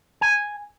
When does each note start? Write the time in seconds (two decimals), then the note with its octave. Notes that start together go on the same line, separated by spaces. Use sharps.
0.21 G#5